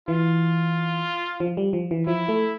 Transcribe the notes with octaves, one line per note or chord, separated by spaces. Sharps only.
E3 F4
F3
G3
F3
E3
F3 E4
A3